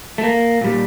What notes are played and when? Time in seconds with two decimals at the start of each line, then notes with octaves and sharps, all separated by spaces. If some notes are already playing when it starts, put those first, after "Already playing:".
0.18 A3
0.24 A#3
0.61 A#2 G3